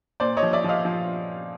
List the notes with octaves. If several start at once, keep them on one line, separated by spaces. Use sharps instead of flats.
A#2 C5 D5
C#5 D#5
F3
D5 E5
F3 D#5 F5
F3